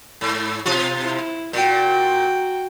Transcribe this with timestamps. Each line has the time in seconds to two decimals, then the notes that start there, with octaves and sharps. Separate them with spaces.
0.21 G#2
0.66 B2 F4
1.02 E4
1.53 A#2 F#4 G5